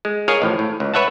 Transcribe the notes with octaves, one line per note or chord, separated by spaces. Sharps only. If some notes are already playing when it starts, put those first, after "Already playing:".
G#3
G#4 A#4 C#5 D#5 F5 G#5
A1 A2 F3
A2
C#2
B4 C#5 E5 F#5 A5